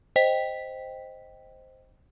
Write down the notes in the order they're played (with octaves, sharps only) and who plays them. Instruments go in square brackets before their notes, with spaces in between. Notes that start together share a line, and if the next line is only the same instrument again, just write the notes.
[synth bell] C5 D#5 G5 B6